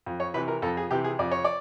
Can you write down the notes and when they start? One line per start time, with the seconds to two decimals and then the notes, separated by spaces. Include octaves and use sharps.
0.06 F2
0.20 C#5
0.34 C3 E3 B4
0.48 A#4
0.62 F2 A4
0.77 G#4
0.91 C3 E3 G4
1.04 G#4
1.19 F2 D5
1.31 C#5
1.44 D5